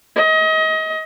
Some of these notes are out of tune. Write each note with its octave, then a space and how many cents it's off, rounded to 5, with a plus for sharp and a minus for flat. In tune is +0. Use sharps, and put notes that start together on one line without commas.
D#5 +30